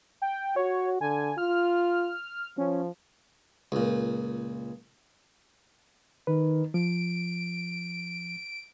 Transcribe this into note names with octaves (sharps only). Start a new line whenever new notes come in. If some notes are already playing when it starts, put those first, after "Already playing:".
G5
F#4 C#5
D3 G#5
F4 F6
F3 C#4
C#2 A#2
D#3 B4
F3 D7